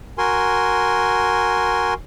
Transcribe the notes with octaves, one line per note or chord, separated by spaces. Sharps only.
F#4 A#4 G#5 C6